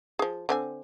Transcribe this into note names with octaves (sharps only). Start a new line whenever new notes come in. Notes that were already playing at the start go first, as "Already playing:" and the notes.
F3 G#4
D3 C4 G#5